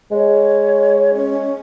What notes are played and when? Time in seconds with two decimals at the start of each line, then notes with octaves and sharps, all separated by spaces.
0.11 G#3 C#5
1.14 C#4